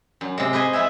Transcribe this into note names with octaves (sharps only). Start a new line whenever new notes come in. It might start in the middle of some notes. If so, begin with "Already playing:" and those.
F#2
C3 G#3
B4 C5 D#5 G#5
F3 E4 B4 E5 G#5